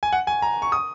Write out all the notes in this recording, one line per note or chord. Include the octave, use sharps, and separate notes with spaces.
G#5
F#5
G#5
A#5
C#6
D#6